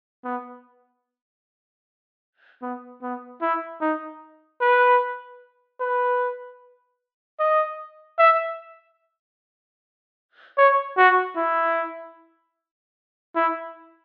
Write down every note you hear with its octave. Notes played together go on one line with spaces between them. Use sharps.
B3
B3
B3
E4
D#4
B4
B4
D#5
E5
C#5
F#4
E4
E4